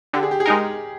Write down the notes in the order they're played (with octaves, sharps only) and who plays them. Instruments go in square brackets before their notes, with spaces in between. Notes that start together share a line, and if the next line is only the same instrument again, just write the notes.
[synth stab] D3 [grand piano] G4
[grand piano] G#4
G4
G#4
[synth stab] G#3 D#4 A#4 [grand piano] G4